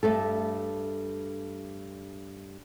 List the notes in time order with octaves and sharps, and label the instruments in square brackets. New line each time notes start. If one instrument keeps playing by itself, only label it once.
[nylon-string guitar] G2 A3 A4